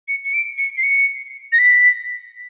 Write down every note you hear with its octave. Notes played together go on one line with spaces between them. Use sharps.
C#7
C#7
D7
C#7
C7
C#7
A#6
B6